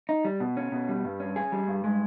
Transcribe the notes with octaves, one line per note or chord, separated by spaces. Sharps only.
D#4
G3
B2
C#4
B2
G3
G2
C#4
G#4
G3
G2
G#3